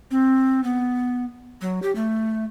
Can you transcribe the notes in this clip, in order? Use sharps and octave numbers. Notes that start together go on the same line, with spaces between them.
C4
B3
F#3
G4
A3